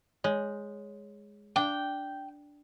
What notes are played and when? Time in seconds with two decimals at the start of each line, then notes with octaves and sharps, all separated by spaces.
0.24 G#3 C#5
1.56 D4 G5